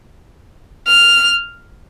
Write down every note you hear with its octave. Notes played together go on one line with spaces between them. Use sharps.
F6